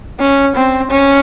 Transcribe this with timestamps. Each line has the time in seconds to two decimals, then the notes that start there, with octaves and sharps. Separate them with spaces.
0.20 C#4
0.56 C4
0.91 C#4